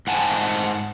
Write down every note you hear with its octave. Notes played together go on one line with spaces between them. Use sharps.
G#2 F#5 G#5 A5